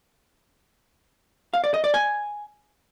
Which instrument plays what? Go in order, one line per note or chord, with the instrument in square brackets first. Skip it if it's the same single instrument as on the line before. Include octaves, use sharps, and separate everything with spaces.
[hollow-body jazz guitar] F5
D5
D#5
D5
G#5